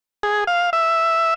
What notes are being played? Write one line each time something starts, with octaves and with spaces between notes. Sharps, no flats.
G#4
F5
E5